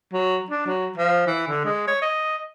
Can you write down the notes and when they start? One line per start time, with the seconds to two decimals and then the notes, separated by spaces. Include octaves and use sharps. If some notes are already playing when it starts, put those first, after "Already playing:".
0.13 F#3
0.50 D4
0.66 F#3
0.98 F3
1.27 E3
1.47 D3
1.65 G#3
1.87 C#5
2.02 D#5